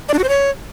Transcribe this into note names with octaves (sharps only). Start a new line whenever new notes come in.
D5
D4
F#4
C5
C#5